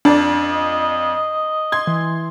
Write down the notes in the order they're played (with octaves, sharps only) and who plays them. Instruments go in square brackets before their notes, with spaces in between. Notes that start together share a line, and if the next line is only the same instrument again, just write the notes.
[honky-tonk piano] F2 D5 [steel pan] D4
[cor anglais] D#5
[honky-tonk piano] C6 G#6
[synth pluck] E3